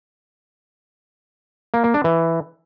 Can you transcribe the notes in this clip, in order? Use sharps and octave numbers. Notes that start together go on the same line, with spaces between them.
A#3
A#3
D4
E3